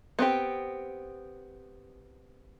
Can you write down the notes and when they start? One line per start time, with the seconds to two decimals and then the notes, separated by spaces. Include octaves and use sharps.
0.19 B3 C4 G4